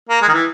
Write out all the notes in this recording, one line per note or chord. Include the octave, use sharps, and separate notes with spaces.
A#3
G#3
D#3
E3